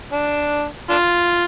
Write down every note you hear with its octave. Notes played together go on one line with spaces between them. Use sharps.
D4
D4 F4